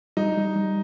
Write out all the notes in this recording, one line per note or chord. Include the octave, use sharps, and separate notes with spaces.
G3 D#4
G3
G3